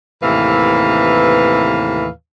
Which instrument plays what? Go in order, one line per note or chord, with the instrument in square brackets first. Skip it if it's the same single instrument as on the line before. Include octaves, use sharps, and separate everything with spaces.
[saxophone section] D#2 A2 C3 E3 B4 F5